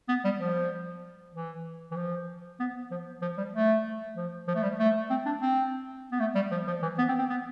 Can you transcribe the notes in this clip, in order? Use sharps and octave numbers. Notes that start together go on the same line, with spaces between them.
B3
G3
F3
E3
E3
F3
B3
F3
F3
G3
A3
F3
F3
A3
G3
A3
C4
D4
C4
B3
A3
G3
F3
F3
E3
B3
C4
C4
B3